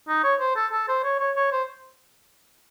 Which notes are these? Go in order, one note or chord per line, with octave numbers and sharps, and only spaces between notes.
D#4
C#5
C5
A4
A4
C5
C#5
C#5
C#5
C5